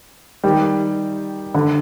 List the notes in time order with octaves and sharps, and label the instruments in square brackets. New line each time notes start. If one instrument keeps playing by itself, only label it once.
[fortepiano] D#3 G3
D3